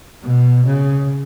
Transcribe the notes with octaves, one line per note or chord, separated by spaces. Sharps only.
B2
C#3